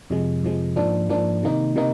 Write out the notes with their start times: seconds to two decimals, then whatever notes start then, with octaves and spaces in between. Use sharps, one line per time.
0.10 F2 C3 F3 G#3
0.43 F2 C3 F3 G#3
0.76 G#2 F3 A#3 D4
1.09 G#2 F3 A#3 D4
1.43 C3 D#3 A#3 D#4
1.76 C3 D#3 A#3 D#4